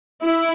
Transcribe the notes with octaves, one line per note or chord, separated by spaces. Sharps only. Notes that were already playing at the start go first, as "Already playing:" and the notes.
E4